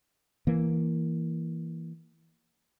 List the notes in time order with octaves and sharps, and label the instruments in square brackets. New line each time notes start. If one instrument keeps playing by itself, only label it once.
[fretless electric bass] E3 A#3